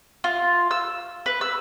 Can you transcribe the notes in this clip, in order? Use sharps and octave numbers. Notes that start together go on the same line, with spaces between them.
F4
E6
B4
E6